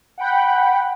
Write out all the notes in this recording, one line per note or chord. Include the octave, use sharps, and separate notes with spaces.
F#5 G5 B5